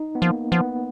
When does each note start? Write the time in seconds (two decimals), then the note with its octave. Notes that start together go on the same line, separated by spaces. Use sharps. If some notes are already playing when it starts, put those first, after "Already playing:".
Already playing: D#4
0.15 B3
0.21 F3 A#3
0.52 F3 B3